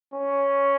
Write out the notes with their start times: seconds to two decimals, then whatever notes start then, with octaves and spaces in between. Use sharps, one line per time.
0.13 C#4